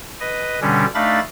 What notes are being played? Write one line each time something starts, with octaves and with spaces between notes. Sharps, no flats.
B4 D#5
B2 D3 G3 C#4 D4
A3 D4 D#4 F5 B5 A6